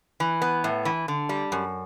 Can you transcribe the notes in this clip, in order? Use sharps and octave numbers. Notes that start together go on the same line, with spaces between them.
E3
B3
A2
E3
D3
G3
F#2